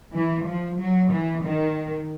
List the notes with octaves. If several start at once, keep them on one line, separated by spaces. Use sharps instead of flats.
E3
F3
F#3
E3
D#3